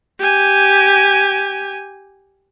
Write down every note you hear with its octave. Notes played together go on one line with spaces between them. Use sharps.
G4 G#5